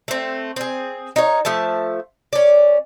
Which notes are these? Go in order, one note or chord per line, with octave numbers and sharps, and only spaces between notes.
A3 C4
C4 G#4
D#4 A#4 C#5
F3 A3 E5 A5
C#4 D5